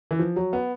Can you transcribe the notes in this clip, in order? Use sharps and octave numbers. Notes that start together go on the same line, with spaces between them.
E3
F3
F#3
B3